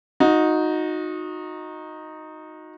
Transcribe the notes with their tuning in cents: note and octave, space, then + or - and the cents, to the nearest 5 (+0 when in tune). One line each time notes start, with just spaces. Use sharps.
D#4 +0 F#4 -30